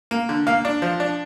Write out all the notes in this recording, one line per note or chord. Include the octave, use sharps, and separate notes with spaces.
A#3
D3
A#3 F5
D4
F3
D4